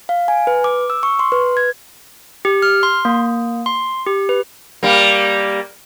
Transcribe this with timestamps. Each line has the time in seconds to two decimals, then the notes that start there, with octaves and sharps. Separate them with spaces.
0.09 F5
0.28 G#5
0.47 B4
0.64 D6
0.90 E6
1.03 C#6
1.19 C6
1.32 B4
1.57 G#6
2.45 G4
2.62 F6
2.83 C6
3.05 A#3
3.66 C6
4.07 G4
4.29 B4
4.83 G3 A#3